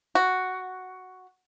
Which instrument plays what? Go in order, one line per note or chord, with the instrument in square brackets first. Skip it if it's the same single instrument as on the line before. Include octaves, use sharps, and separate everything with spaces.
[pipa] F#4